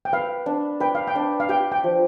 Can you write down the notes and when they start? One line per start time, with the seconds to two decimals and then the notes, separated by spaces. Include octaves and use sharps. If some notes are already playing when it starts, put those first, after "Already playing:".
0.05 G5
0.13 B4 F5
0.46 D4
0.80 B4 G5
0.95 F5
1.07 G5
1.16 D4
1.40 F5
1.49 G4 G5
1.72 G5
1.84 F3